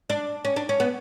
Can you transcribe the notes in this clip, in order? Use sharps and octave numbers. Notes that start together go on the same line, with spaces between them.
D4
C#4
D4
C#4
B3